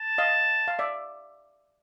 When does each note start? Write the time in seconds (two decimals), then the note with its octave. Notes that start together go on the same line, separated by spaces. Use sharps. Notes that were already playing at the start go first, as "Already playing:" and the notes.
Already playing: A5
0.18 D#5 F5
0.68 F5
0.79 D5 E5